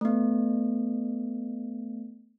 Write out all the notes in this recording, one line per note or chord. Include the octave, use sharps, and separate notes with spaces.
A3 B3